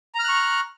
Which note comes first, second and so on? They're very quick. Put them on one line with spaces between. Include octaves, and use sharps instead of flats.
A#5 F6 F#6 C#6